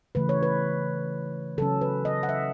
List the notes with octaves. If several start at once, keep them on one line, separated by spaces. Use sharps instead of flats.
C#3 E3 A3 B4
C#5
B4
C#3 F#3 C#4 A4
B4
D#5
F#5
E5